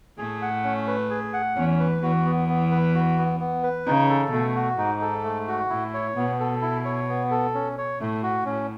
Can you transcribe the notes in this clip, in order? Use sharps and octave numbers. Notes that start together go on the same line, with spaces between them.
A2 A3 G#4
F#5
C#4
B4
G#4
F#5
E2 E3 C#4
B4
E2 E3 F#4
B3
B3
B4
F#4
B3
B3
B4
C#3 D#4
A4
B2 A3
F#4
G#2 D#4
A4
A3
F#4
A2 E4
C#5
B2 B3
A4
E4
C#5
B3
A4
C#4
C#5
A2 A3
F#4
A2 C#4